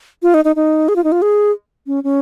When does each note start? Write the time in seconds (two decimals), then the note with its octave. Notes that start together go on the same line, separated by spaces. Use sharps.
0.23 F4
0.34 D#4
0.45 D#4
0.56 D#4
0.88 G#4
0.96 F4
1.04 D#4
1.12 F4
1.22 G#4
1.87 C#4
2.04 C#4